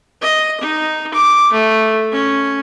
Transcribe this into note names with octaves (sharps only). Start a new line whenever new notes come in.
D#5
D#4
D6
A3
C#4